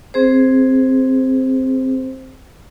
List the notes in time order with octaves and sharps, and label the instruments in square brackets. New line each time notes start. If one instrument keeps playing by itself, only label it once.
[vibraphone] C4 G#4 C5